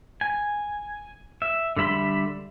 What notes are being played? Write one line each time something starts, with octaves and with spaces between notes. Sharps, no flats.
G#5
E5
D3 G3 E5 B5 C6